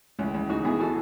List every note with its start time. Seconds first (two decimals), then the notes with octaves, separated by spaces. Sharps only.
0.19 C#2 C#4 E4
0.34 C#2
0.49 C#2 D#4 F#4
0.65 B2 E4 G#4
0.80 F#4 A4